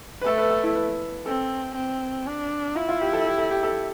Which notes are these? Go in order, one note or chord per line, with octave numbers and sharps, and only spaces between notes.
B4
A3 A4
B4
A4
E4
B4
C4 A4
C4
D4
E4 F4
F4
G4
A4
G4
A4
G4
A4